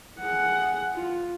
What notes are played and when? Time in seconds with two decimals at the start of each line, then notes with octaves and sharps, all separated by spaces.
0.20 G#4 F#5
0.94 F4